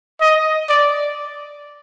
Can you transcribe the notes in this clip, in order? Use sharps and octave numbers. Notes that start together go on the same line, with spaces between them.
D#5
D5